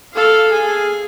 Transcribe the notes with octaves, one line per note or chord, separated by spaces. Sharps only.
A4 F5
G#4 G#5